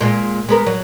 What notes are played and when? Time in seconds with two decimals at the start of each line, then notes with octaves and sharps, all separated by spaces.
0.01 A#2 G#3
0.49 G#3 B3 A#4
0.67 F#3